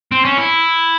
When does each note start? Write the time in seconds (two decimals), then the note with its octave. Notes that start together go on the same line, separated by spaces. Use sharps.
0.12 C4
0.25 C#4
0.38 E4